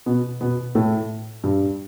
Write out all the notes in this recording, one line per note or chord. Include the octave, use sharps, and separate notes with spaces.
B2 B3
B2 B3
A2 A3
G2 G3